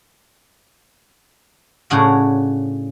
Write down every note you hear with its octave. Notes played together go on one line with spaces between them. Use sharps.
A2 C#3 D4 F#4 G#4 A#4